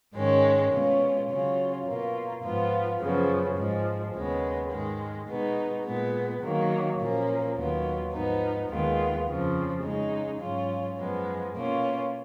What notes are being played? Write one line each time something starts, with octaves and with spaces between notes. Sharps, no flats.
G#2 D#3 G#3 C#4
B2 G#3 C#4 F4
C#3 F#3 C#4 F4
B2 A#3 F4
G#2 F3 B3 F4
F#2 C#3 F3 B3
G#2 F3 G#3
D#2 C#3 G#3 B3
G#2 D#3 G#3
B2 G#3 B3 D#4
A#2 G#3 B3
D#3 F#3 A#3
A#2 F3 A#3 C#4
D#2 D#3 F#3 B3 F4
G#2 F3 B3 D#4
D#2 D#3 G#3 B3 F4
F2 C#3 F3
C#3 G#3 D#4
G#2 F#3 C#4 F4
F#2 F3 G#3 B3
B2 A#3 C#4 F4